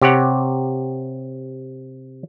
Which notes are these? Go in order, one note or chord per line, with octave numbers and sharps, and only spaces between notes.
C3 G4 C#5 F#5